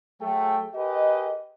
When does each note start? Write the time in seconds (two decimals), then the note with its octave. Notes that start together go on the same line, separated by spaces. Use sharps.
0.21 F#3 A3 G#4 G5
0.74 G4 G#4 A#4 B4 D#5